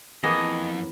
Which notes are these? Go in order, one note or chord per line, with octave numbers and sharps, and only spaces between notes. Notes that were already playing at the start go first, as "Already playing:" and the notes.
F2 E3 A#3 B3 G#4 D#5